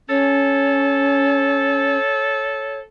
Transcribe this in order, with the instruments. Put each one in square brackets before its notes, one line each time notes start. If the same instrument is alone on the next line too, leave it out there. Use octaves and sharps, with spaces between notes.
[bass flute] C#4 [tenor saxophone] A4 [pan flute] C#5